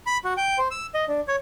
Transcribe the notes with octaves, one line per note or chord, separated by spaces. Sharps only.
B5
F#4
G5
C5
E6
D#5
D4
C#5